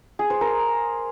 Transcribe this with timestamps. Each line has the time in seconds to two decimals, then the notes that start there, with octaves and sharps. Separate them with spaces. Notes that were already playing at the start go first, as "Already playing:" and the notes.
0.19 G#4
0.30 C5
0.41 A#4